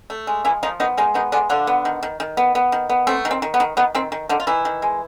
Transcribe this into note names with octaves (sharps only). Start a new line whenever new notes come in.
A3
G#3
E3 F3 E4
D#3 F3 D#4
D#3 B3 D#4
D#3 G#3 D#4
D#3 B3 D#4
D3 G#3 D4
D3 F3 D4
B3
D#3
D#3
D#3
B3
B3
D#3
B3
A3 C4
D#3
C4
D#3
B3
D#3
D#3 B3
D#3 C4
D#3
D3 D#3 D4
F4
D#3 E3 E4
D#3
G#3